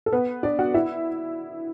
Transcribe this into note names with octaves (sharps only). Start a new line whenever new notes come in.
A4
B3 B4
D4 D5
F#4 F#5
E4 E5